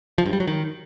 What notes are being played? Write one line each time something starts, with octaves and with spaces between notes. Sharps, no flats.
F3
G2
G3
F#3
D#3